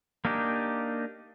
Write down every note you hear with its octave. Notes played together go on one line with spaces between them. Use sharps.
A#3 D4 D#4 G4